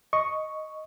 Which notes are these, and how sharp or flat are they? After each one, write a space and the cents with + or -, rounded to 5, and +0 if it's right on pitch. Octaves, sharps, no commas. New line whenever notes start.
D#5 +0 C#6 +0